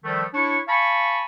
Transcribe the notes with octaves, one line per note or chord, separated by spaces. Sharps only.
D#3 F3 G3 A3
D4 E4 C#5 C#6
F5 G#5 A5 B5 C#6